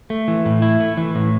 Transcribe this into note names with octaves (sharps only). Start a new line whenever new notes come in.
A3
E3
A2
E4
A3
E3
A2